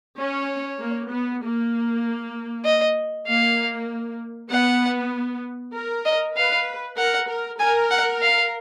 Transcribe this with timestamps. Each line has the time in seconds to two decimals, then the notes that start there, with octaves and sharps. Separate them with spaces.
0.18 C#4 C#5
0.80 A#3
1.11 B3
1.43 A#3
2.65 D#5
3.27 A#3 F5
4.50 B3 F#5
5.74 A#4
6.05 D#5
6.37 B4 F5
6.98 A#4 F#5
7.29 A#4
7.59 A#4 G#5
7.91 F#5
8.21 F5